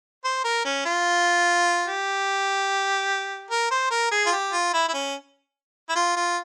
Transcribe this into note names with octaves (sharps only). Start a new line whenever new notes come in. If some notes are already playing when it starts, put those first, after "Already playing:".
C5
A#4
C#4
F4
G4
A#4
C5
A#4
G#4
F4
G4
F4
E4
E4
C#4
E4
F4
F4